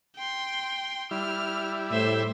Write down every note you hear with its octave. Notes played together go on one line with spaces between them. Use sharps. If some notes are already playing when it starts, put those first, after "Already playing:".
G5 C6
G3 E4 F6
A2 C5 E5